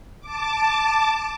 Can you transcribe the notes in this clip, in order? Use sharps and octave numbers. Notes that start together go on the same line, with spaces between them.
A5 D6